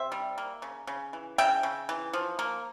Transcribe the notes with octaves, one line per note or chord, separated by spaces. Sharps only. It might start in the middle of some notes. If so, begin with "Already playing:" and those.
Already playing: C3 C5 E5
G3
A#3
C#3
C#3
E3
C#3 E5 G5
C#3
E3
F3
A#3